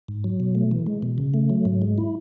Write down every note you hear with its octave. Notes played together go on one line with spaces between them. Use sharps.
G#2
F#3
B2
A3
E3
G#3
B2
C#3
A3
F#3
G#2
G#3
E4